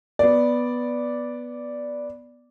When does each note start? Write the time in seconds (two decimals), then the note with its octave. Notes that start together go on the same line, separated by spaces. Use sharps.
0.19 B3 D5